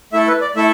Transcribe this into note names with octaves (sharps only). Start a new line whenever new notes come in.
A3 E4 A4 E5
B4
D5
A3 E4 A4 E5